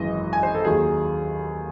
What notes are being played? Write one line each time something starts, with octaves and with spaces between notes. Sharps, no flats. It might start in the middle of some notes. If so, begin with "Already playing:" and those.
Already playing: G#1 F#2 E3 G#3 D#5
G#5
C5
A4
D#2 D#3 F#3 G#4